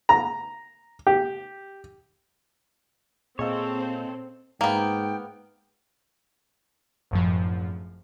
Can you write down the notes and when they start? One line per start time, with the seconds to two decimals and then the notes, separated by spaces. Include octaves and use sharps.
0.09 A#5
1.07 G4
3.39 A#2 C4 G#4 A4 C#5 D#5 F5
4.61 G#2 A#3 B3 G5
7.11 G#1 F#2 A2 F3